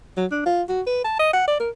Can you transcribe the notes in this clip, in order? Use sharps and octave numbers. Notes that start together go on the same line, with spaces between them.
F#3
D4
F4
F#4
B4
A5
D#5
F#5
D5
A#4